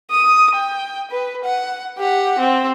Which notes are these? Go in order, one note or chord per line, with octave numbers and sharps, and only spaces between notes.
D#6
G5
B4
F#5
G4 F#5
C4